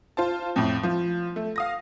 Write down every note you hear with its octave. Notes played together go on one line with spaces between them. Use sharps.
F4 C5 A5
F2 A2
F3
A3
F5 D#6 A#6